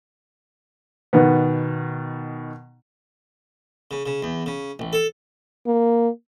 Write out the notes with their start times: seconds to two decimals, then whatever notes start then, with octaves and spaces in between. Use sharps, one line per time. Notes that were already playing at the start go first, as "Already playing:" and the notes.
1.13 B2 D#3 B3
3.91 C#3
4.06 C#3
4.22 E2
4.46 C#3
4.79 A1
4.93 A4
5.67 A#3